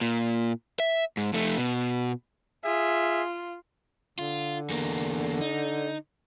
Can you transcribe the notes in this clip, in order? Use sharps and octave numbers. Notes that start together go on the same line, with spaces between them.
A#2
E5
G#2
F2 A3
B2
F4 G#4 E5
D3 F4
E2 A#3
D#4